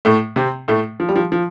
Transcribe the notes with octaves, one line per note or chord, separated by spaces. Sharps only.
A2 A3
C3 C4
A2 A3
F3
G3
F3
F3